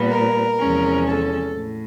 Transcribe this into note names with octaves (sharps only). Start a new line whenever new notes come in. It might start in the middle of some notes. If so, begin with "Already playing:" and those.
Already playing: A#2 G3 B3
A#4
E2 C3 F3 G#3 C#4
A4
A2